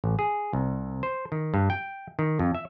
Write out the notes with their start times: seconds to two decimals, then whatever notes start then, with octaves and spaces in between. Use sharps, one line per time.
0.04 A1
0.19 G#4
0.53 C2
1.03 C5
1.32 D#3
1.54 G2
1.70 G5
2.19 D#3
2.39 F2
2.55 E5